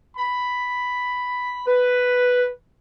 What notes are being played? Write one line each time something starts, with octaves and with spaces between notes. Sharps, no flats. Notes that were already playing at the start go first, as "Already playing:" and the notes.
B5
B4